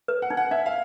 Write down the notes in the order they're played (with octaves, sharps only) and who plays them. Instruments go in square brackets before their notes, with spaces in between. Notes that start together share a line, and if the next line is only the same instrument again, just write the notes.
[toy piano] B4
[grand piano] F#5
[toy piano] D#4
[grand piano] F#5
[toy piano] D#4 [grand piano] E5
[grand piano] F5